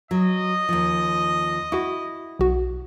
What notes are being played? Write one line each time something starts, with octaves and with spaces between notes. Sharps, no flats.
F#3 D#5
D#2 F3
E4 F#4 C#6
B1 F#4